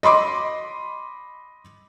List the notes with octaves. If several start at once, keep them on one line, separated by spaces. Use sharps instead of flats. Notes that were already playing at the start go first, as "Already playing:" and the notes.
D#5 B5 C6 D6